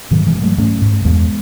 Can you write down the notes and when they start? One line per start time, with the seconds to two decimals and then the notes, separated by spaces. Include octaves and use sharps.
0.11 G#2 D#3 F#3
0.27 E3 G#3
0.35 G#2
0.42 F#3 A3
0.58 G#2 A3 C#4
0.82 G#2
1.05 E2 G#3 B3